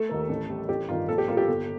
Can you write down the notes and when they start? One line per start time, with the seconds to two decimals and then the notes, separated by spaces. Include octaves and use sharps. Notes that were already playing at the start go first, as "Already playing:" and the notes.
Already playing: A3 A4
0.09 D#2 D#3 A#3
0.29 A1
0.49 A2 G3
0.69 A1 G4
0.88 G2 D#3 F4
1.09 A#1 A4
1.18 G4
1.28 A2 G3 A#3 F4
1.37 G4
1.48 G1